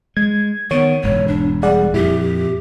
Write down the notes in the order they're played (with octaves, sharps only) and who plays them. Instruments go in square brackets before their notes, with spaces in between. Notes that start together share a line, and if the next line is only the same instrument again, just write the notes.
[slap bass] G#3 [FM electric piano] G#6
[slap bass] D#3 [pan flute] B3 [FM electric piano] C#5
[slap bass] E1 [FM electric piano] G#2 [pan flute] C#5
[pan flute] D4
[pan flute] G3 [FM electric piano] G#4 D5 F#5
[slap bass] F2 A#2 [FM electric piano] E4 [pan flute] G4